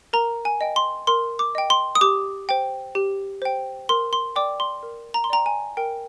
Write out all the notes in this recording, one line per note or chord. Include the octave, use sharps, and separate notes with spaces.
A#4 A#5
G#5
D#5 G5
C6
A#4 C6
D6
D#5 G5
C6
D#6
G4 D6
C5 G5
G4
C5 G5
A#4 C6
C6
D5 G5 D6
C6
A#4
A#5
C6
D5 G5 A#5
G#5
A#4 G5